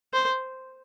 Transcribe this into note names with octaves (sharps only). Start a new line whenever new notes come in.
C5